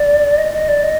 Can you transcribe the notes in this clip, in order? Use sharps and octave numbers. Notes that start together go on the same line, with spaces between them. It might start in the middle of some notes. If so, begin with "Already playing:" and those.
Already playing: D5
D#5
D#5
D5
D#5